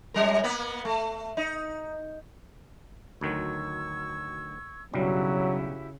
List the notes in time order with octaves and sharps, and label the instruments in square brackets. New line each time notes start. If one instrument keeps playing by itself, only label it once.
[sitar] F#2 G3 A#4
A#3 B3 B4
A3
D#4
[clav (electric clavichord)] D2 D#3 F#3 [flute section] C#6 E6 G#6
[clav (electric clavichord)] B1 G2 G3 [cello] C#3 [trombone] F#3 [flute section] E4 F#4 G4